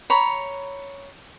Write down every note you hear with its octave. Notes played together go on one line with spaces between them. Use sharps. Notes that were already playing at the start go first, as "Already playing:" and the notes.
C#5 A#5 B5